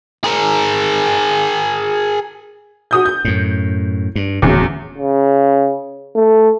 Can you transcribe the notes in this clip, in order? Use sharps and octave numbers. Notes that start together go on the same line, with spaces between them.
G#4 A#4
F#4 D#6 G6
G6
F#2 A2
G2
D1 E2 C#3 F#3
C#3
A3